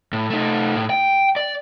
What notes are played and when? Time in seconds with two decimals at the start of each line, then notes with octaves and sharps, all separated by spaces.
0.13 A2
0.30 A3 D#4
0.76 A2
0.90 G5
1.36 D5